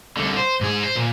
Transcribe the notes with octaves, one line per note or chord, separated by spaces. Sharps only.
C2 D3
C5
G#2 G#4
C5
A#2